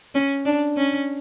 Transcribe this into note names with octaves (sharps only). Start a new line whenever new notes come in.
C#4
D4
C#4